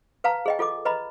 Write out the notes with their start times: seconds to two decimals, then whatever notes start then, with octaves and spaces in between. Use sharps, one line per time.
0.24 B4 F5 A5 A#5
0.46 G#4 D#5 G5
0.59 F4 A4 D#5 D6
0.85 B4 D#5 A#5 B5